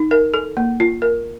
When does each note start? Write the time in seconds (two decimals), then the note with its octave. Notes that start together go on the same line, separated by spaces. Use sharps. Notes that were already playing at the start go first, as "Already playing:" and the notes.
Already playing: D#4
0.11 A#4
0.34 A4
0.57 A#3
0.80 F4
1.02 A#4